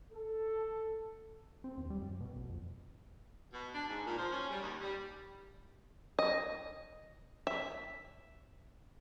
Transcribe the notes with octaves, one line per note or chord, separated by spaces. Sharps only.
A4
C4
D#2
G3
F#2
B2
A1
F2
B2
D4
G#2
A#2
F3
C#4
G3
D#2
G3
D#5
E5